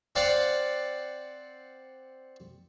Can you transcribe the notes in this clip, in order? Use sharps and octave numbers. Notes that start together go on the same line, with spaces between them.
C4 D5 F5 F#5